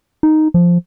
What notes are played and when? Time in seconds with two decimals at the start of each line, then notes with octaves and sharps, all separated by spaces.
0.23 D#4
0.54 F3